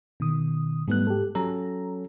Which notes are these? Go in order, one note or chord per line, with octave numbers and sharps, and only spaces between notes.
B2 D#3 D#6
G#2 G3 A3 B3 F#6
G4 A4
F#3 C#4 A4 A#5